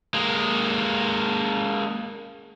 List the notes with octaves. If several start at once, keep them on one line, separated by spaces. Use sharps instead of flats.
G#3 A#3